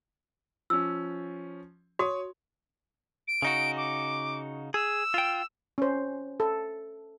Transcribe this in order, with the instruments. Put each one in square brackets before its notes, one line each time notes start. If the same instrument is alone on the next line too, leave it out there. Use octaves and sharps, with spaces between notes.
[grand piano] F3 C#4 [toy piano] E6
[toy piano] F#4 [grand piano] C#5 D#6
[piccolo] D7
[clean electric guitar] C#3 D#4 F#4
[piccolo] D6
[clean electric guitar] G#4 [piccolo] E6
[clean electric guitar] F4 G5
[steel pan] C#4 C5
A4